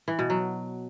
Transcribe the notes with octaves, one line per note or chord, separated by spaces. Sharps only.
E3
B2
F#3